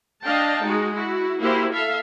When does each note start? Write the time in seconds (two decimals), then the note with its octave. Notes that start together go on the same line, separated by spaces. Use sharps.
0.25 D4 D#5 F5 G5 A5
0.63 G#3 D#4 F#4
0.93 E4 F#4
1.40 A#3 E4 F#4 G4 C5
1.71 A4 E5 F5